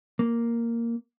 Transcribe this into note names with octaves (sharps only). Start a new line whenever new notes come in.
A#3